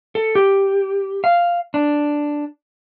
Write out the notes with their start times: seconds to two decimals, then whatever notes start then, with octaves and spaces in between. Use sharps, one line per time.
0.15 A4
0.35 G4
1.24 F5
1.74 D4